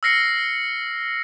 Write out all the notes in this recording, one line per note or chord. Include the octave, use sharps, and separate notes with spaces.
E6 F6 A#6 C7 C#7